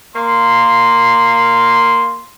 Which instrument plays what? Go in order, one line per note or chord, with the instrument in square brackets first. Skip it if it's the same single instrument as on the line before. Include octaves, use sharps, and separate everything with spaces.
[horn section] A#3 C6